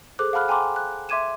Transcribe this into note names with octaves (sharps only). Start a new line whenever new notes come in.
G#4 A4 C5 D6 F#6
F5 F#5 A5 B5 F6 F#6
G5 G#5 A#5 C6 D6
F#6
E5 C6 D6 G#6 D#7 E7